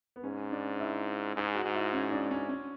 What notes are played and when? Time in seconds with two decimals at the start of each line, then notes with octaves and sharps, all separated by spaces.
0.16 B3
0.24 G#2 C#4
0.52 D4
0.80 E4
1.36 G#2 G#4
1.55 F#4
1.65 G#2
1.75 E4
1.93 C#4
2.12 D4
2.31 C#4
2.49 C#4